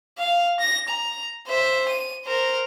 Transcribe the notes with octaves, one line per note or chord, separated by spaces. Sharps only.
F5
A#6
A#5
C5 E5
D#7
A#4 C5